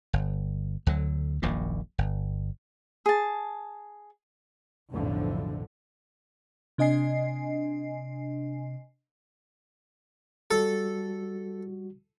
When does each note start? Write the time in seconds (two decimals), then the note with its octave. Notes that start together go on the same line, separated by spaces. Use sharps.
0.13 G1
0.87 D2 D3 F#3
1.42 D#1 A#1 F#2 A#2
1.98 G1
3.06 G#4 A5
4.91 B1 F2 A2 D3 E3 F3
6.78 C3 D4 D#5 G#5 C7
10.51 G3 F#4 A4